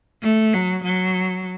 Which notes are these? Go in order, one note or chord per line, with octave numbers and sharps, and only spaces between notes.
A3
F#3
F#3